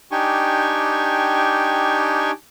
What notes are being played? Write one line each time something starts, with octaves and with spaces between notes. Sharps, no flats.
D4 D#4 G4 G5 G#5 C#6